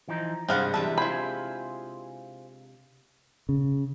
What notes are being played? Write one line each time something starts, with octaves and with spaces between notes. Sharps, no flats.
E3 F3 D#4
G2 C3 G#3 B3 C4 D4 F5 F#5
C3 E3 G3 B4 E5 A5
E4 F4 G#4 C5 B5
C#3